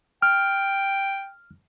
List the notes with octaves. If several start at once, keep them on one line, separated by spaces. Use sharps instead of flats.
G5 F6